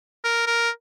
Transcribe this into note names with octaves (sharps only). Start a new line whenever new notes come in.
A#4
A#4